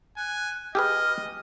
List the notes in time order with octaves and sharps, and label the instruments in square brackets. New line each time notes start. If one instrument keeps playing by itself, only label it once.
[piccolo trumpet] G#5 [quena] F#6
[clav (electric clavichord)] G4 G#4 B4 [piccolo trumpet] D#5 [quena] F6